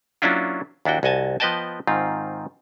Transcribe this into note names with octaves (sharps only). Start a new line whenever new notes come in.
F#3 A#3 C#4 D4 E4 F4
D#2 D4 E4 F#4 G5
C2 F#4 D#5 G#5 A5
F3 B3 B4 D#5 G5 A5
G#2 D#3 C4 F4